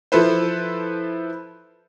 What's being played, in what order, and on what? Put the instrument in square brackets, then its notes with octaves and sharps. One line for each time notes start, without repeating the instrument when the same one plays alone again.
[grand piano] F3 E4 A4 B4 C5